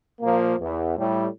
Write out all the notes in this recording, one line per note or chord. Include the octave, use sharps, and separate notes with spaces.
A#2 F3 A#3
E2
A2 G3